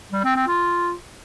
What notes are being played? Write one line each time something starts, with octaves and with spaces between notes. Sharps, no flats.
G3
C4
C4
F4